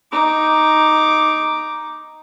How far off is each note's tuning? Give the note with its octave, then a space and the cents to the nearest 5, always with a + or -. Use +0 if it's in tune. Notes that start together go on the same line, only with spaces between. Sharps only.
D#4 +0 D6 +0